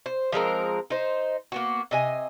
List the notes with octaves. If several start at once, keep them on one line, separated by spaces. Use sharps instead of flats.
C5
F3 G#3 C4 A#4
D#4 C5
A#3 B3 F#4
C3 D#5 G#5